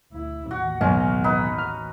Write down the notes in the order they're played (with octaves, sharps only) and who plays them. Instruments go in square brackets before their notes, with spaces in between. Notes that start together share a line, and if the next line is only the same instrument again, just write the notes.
[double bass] D2 E4
[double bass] A1 D#2 [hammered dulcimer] F#4
[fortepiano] B1 [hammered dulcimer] C#4
[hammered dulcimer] D#4 B4
[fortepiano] F6